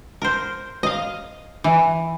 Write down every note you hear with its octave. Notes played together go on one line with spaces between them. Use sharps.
A#4 C5
D#5 F5
E3